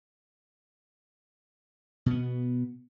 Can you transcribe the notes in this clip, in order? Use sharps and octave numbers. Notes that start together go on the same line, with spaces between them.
B2 B3